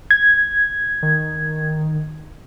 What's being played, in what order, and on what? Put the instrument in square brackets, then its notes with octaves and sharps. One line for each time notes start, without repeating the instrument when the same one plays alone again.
[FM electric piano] G#6
[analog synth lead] D#3